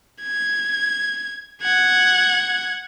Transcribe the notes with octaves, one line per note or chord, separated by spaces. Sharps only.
G#6
F#5 G#6